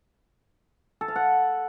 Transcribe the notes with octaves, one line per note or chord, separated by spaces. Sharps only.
A4
F5
F#5